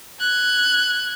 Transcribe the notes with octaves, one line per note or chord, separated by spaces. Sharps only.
F#6 G#6